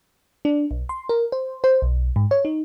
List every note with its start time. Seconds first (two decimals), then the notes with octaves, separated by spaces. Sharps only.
0.45 D4
0.71 B1
0.89 C6
1.09 A#4
1.32 C5
1.64 C5
1.82 B1
2.16 G#2
2.31 C#5
2.45 D#4